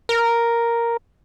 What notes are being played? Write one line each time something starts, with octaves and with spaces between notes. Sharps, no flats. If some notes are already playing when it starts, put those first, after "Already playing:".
A#4